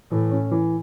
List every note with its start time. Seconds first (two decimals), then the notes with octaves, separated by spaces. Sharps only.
0.11 A2 E3
0.31 C#4
0.51 E3